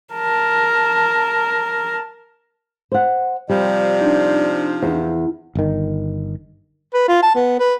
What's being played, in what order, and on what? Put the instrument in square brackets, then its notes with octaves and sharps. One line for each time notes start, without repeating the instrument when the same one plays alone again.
[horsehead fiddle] A#4 A5
[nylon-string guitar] C5 F#5
[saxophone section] C3 F3 [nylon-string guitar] G3 [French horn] D5
[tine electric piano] D4 D#4
[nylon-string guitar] E2
[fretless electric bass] G1 D#3
[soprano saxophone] B4
F4
A5
B3
B4